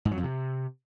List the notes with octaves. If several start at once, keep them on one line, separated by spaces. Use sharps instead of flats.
G#2
F#3
F2
C3